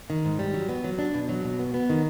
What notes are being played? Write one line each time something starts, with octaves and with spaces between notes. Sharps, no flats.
D#3
G#2
G3
F#3
B3
F#3
D4
B2
F#3
B2
B3
B3
D#3